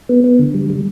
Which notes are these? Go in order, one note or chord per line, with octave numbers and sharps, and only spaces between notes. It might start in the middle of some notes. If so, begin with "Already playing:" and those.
B3
B3
D3
G3
G3